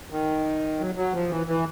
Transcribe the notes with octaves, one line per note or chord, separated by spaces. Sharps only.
D#3
F#3
F#3
F3
E3
E3